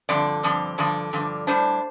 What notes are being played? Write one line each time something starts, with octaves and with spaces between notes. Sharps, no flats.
G2 D3 F3 C4 D5
G2 D3 F3 C4
G2 D3 F3 D5
G2 D3 F3
A2 G3 D4 C5